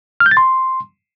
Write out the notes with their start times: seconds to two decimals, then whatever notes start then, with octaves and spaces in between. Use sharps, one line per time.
0.20 F6
0.26 G6
0.31 A6
0.37 C6